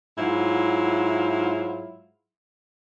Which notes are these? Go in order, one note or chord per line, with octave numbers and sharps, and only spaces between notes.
G#2 F#3 E4 F4